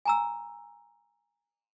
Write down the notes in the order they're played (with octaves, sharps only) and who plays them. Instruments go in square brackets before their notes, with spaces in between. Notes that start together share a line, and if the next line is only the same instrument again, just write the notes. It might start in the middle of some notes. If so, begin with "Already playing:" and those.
[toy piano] G#5 A#5 E6